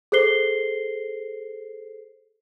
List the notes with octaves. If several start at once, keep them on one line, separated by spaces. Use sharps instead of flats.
G#4 A4 C5 C7 G7